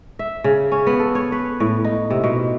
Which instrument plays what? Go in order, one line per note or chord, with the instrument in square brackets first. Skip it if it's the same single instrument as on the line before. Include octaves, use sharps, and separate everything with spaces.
[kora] E5
C#3
C#4
B3
A4
C#5
B4
A2
D#4
C3
B2